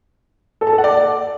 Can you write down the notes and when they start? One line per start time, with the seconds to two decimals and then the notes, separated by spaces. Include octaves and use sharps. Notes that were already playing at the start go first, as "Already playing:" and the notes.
0.61 A4
0.67 A5
0.73 A4
0.78 F#5
0.84 D5